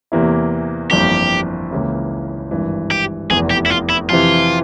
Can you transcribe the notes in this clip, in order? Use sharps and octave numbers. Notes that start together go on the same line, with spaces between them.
E2 C3 E3 A#3 E4
G1 F2 E3 A#3 G4
C#2 C#3 E3 A#3 E4
G#1 G2 E3
G4
F1 E2 E3 G#4
G4
E4
F4
E4
F2 C3 E3 F4